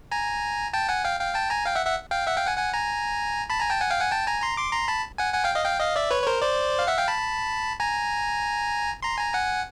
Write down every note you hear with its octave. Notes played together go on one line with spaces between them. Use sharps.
G#5 A#5
G5 A5
F#5 G#5
F5 G5
F5 G5
G5 A5
G#5 A#5
F5 G5
E5 F#5
E5 F#5
F5 G5
E5 F#5
F5 G5
F#5 G#5
F#5 G#5
G#5 A#5
A5 B5
G#5 A#5
G5 A5
F#5 G#5
F5 G5
F#5 G#5
G5 A5
G#5 A#5
A#5 C6
C6 D6
A#5 C6
A5 B5
F#5 G#5
F#5 G#5
F5 G5
D#5 F5
F5 G5
D#5 F5
D5 E5
B4 C#5
C#5
A#4 C5
C5 D5
F5
E5 F#5
F5 G5
A5 B5
G#5 A#5
A#5 C6
G#5 A#5
F#5 G#5